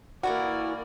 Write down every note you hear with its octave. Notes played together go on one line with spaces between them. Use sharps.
E3 A#3 E4 F#4 D5 F#5